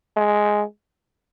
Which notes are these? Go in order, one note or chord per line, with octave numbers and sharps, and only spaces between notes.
G#3